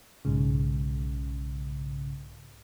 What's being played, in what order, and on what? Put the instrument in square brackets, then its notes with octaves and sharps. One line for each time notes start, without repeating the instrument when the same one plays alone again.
[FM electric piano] B1 G#2 C#3